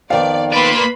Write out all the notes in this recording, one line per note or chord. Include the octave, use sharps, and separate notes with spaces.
F2 D#3 B3 D5 F5
A#3 B4 D5 B5 C6